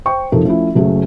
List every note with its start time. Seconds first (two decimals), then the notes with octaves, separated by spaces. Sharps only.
0.06 C5 G5 C#6
0.32 C2 F2 F3 D#4 A4 A#4
0.45 F3 A3 C#4 E4
0.75 F#1 F#3 A3 C#4 G#4